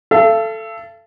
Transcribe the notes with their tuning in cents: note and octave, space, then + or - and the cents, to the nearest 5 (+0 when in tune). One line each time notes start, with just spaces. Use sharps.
A4 +0 F5 -45